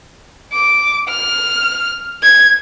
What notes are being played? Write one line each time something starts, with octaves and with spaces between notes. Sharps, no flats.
D6
F6
G#6